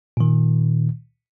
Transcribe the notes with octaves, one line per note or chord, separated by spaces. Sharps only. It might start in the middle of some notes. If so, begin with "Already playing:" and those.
A#2 D#3